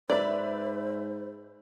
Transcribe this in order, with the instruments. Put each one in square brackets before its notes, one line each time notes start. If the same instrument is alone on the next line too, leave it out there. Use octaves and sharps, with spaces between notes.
[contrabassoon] G#2 [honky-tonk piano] B4 E5 B5 [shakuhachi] C5 [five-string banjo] D5